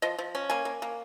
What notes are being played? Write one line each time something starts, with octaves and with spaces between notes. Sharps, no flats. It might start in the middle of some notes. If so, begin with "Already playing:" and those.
F3 D#5
F3
C#4
A#3 G#5
A#3
A#3